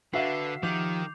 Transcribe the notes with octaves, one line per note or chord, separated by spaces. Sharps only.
D3 F#4 B4 E5 F5 C7
D#3 F3 D#4 G4 D6 G6 F7